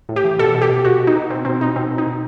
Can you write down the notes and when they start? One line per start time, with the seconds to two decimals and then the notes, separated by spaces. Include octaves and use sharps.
0.09 A2
0.16 G4
0.24 E3
0.39 B2 A4
0.55 B2
0.62 G4
0.70 B2
0.85 B2 F#4
1.00 B2
1.07 D#4
1.15 B2
1.30 B2 C4
1.45 B2 C4
1.61 B2 D#4
1.76 B2 C4
1.91 B2
1.98 D#4
2.07 B2